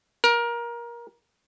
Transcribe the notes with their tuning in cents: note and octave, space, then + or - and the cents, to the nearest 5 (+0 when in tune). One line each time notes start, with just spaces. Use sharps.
A#4 +20